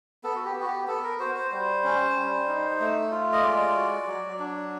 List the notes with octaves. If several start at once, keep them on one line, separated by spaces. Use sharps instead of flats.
B3 A4
F#4
G4
B3
F#4
G4
B3 A4
A#4
F#4 C5
C5
G3 C5
C#4
G3
D#4
A3
F4
D#5
G#3 D5
F#4
F#3
D4